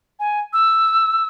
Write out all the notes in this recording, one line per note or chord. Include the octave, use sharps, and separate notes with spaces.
G#5
E6